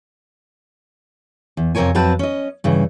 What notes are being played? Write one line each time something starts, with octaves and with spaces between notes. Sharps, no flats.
E2
F2 C3 G#3 A#4 C#5 G#5
F2 F#3 C4 B4 A5
C#4 D#5
G2 C#3 E3